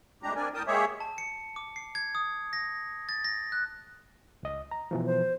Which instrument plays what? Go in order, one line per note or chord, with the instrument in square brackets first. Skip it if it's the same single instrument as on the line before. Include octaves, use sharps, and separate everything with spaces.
[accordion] A2 C3 G#3 D4 G4 A#5
C4 D4 A#4 D5 G#5
A2 A#4 G5 A5 D#6
G#3 A#3 G4 G#4 C#5 E5
[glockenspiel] A5
C#7
D6
C7
G#6
D#6
A#6
A6
A#6
F#6
[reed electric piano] C#2 D#5
A#5
B2 E3 F3
[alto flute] C5